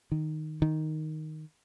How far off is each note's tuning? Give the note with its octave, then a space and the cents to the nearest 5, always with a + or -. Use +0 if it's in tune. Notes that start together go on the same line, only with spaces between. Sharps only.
D#3 -5
D#3 +0